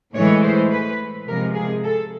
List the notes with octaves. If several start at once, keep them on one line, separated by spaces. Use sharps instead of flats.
A2 E3 G#3 C#5
C5
B4
C3 F3 G#3 A#4
G#4
A4